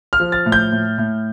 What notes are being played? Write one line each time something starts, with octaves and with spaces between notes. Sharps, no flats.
F6
F3
A6
A2
G6
A2
A2